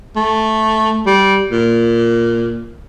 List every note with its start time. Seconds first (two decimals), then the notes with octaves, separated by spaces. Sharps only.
0.16 A3
1.07 G3
1.51 A#2